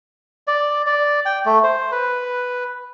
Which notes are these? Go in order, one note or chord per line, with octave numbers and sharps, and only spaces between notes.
D5
D5
G5
A3
C5
B4